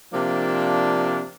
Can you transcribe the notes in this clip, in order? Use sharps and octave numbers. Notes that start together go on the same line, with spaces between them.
C3 F3 A#3 D4